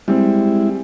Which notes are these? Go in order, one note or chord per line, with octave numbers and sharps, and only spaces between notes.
G3 G#3 C4 E4